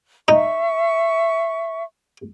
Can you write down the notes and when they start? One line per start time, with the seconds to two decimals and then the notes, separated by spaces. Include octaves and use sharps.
0.28 D#4 E5 C#6